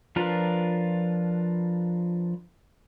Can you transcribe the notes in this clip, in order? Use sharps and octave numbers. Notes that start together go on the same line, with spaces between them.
F3 D4 F4 A#4 B4